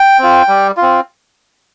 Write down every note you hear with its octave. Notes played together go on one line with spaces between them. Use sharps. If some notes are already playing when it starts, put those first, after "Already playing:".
Already playing: G5
C4 F4
G3
C4 F4